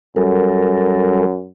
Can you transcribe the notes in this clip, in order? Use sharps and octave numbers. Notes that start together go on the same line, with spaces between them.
F#2 G3 A4 A#4